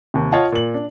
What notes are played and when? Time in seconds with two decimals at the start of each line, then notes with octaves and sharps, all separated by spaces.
0.14 D#2 C3
0.32 F4 C#5 D#5 F5 F#5 A5
0.52 A#2 F#7
0.74 D4